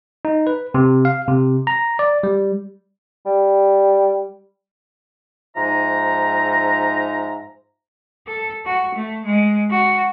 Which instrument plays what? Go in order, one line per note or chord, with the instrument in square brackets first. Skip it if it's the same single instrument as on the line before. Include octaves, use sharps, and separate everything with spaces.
[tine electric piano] D#4
B4
C3
F5
C3
A#5
D5
G3
[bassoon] G3
[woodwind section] G#2 F3 D#4 E5 A#5
[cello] A4
F#4
A3
G#3
F#4